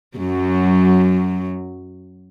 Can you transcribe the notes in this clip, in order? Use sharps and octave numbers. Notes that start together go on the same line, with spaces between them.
F#2 F#3